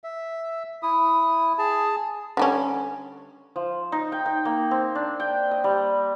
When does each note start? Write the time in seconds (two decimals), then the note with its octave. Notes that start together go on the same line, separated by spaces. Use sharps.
0.04 E5
0.83 E4 D#6
1.58 G#4 A5
2.37 D3 G3 C#4
3.56 F3
3.92 D#4
4.12 G5
4.26 G5
4.45 A#3
4.71 C4
4.95 D4
5.20 G5
5.51 D#5
5.64 G3